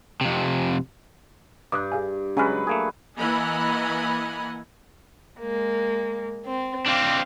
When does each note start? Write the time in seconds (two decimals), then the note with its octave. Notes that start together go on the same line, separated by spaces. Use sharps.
0.21 F2 C3
1.72 G2 D6 D#6 F#6
1.92 G#4 F5 G#5
2.37 C#3 F#3 G#3 C#4 B4 G#5 F6
2.67 A3 A#3 G#4
3.18 E3 A#3 D#5 F#5 G#5 B5
5.41 G#3 A#3
6.46 C4
6.86 C4 D4 F5 D6